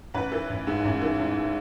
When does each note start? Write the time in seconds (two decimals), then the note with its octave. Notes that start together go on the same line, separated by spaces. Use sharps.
0.14 A1 B4
0.32 E3
0.49 A1
0.67 G#2
0.84 A1
1.02 E3
1.19 A1